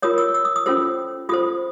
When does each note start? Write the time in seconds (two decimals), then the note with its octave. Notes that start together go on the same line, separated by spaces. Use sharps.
0.02 F4 A#4 C#5 D#6
0.18 E6
0.34 E6
0.45 D#6
0.56 D#6
0.66 C#4 F4 A4 C5 E6
1.29 F4 A4 C5 D#6